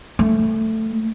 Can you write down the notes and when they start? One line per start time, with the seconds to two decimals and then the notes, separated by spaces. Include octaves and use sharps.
0.19 A3